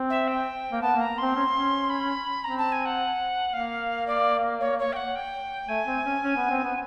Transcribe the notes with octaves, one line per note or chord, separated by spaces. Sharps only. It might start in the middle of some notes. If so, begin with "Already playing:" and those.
Already playing: C4
E5
G5
A#3
B3 A5
A#3 A#5
C4 C6
C#4
C#4
B5
C4 A#5
A5
G#5
F#5
A#3 F5
D5
C#5
C#5
G5
F#5
G5
A3 G#5
C4
C#4
C#4
B3
C4
B3